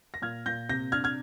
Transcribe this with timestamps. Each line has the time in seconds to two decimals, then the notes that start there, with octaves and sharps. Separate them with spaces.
0.14 A#6
0.22 A#2 F6 G#6
0.46 A#2 G6 A#6
0.69 C3 G6 A#6
0.92 D4 F6 G#6
1.04 F6 G#6